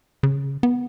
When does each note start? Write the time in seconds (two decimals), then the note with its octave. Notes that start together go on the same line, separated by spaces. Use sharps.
0.23 C#3
0.63 B3